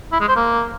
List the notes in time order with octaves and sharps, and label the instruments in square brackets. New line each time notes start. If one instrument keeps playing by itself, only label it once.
[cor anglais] E4
G#3
C5
A#3